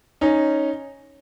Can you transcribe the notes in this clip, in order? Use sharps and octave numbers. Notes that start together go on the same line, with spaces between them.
C#4 D#4